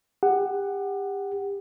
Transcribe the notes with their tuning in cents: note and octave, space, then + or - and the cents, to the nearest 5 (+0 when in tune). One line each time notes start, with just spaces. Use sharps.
G4 +30 F#5 +10